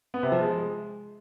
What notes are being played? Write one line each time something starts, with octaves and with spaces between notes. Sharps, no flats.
B3
C3
F3
G#3